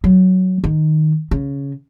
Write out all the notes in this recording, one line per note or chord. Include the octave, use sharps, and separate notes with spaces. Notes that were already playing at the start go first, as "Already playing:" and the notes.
F#3
D#3
C#3